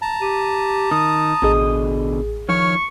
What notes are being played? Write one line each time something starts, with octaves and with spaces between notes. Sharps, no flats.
A5 A#5
G4 D#7
D#3 D#6
A1 B2 D3 G#4 D#5
D#3 F3 C#5 C#6 F6